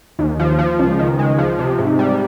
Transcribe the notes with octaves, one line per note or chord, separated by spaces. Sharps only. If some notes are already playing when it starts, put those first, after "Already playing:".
D#2
F3
F3
C#2
D#3
G#3
F3
C3
G#2
G3